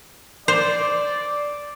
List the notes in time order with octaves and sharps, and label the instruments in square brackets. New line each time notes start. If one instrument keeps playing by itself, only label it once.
[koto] C5 [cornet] D5